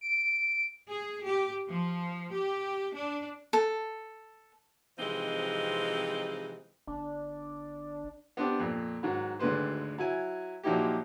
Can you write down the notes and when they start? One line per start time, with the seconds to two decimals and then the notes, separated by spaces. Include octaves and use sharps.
0.01 D7
0.89 G#4
1.24 G4
1.67 F3
2.32 G4
2.93 D4
3.53 A4
4.99 C3 E3 F3 G#3 C4 D#4
6.87 G1 D4
8.37 B3 C4 D4 G4
8.59 F2 A#2
9.03 G#2 D#3 F#3
9.39 G#1 D2 D3 G#3 B4 C5
9.98 F#3 E4 G#5
10.63 A#2 F3 F#3 D#4 E4 G4